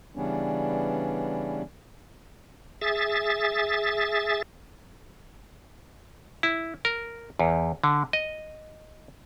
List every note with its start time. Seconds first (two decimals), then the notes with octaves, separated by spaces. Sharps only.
0.16 C#3 E3 G3 B3 C#4 D4
2.81 G#4 E5 A6
6.43 E4
6.85 A#4
7.39 E2
7.84 D3
8.13 D#5